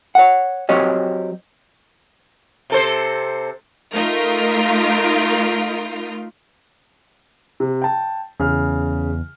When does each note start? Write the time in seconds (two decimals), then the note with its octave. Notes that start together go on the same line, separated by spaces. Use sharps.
0.15 C#5 F#5
0.69 F#3 C4 G4 C#5 D#5
2.70 C3 A4 C5
3.94 A3 D#4 F4 A#4
7.60 C3
7.82 G5 A5
8.40 E2 C#3 F6